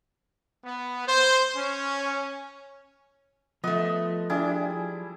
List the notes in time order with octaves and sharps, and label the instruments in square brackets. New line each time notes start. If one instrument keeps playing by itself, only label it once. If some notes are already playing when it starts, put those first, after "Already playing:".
[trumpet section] B3
C5
C#4
[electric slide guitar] F3 [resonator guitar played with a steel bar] A3 B3 [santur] D#5
[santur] G3 E4 G#4 [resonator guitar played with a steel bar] D4